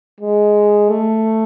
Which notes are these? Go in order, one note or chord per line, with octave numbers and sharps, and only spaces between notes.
G#3
A3